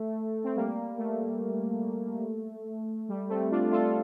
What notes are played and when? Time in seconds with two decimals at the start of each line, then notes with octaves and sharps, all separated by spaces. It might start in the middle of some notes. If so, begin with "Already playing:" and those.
Already playing: A3
0.44 C4
0.56 G3 A#3
0.98 A3
3.09 G3
3.29 A3 C4
3.51 D4 F4
3.71 F4 A4